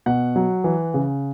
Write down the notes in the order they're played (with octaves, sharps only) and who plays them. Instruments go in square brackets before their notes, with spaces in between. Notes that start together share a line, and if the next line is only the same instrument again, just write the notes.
[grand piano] B2 F#5
F#3
E3
C#3